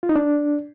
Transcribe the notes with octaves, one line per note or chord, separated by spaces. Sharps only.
F4
D#4
D4